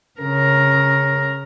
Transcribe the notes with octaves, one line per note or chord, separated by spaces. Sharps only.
C#3 A#4